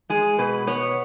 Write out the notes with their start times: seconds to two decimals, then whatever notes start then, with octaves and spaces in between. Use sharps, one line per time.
0.10 G#3 G#4
0.38 B2 B4
0.67 B3 C#5